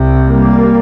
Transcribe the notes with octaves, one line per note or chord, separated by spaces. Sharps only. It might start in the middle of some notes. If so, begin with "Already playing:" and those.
Already playing: C2 C3
G3 A#3